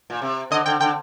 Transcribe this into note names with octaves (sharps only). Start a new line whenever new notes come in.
A#2
C3
D3 D#5
D3 G5
D3 G5